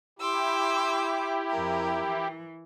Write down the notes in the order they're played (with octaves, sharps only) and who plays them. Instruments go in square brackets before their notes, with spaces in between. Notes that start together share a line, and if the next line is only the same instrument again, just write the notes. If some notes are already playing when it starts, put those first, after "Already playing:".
[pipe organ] E4 G4 [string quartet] C6 D6 E6
[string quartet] F2 A#4
E3